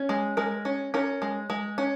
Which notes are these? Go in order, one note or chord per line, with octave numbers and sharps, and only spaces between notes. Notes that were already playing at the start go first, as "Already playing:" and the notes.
Already playing: C#4
G#3
G#3 A#4
C#4
C#4 A#4
G#3
G#3
C#4